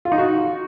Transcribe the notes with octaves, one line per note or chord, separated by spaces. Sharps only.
F4
D#4
F#4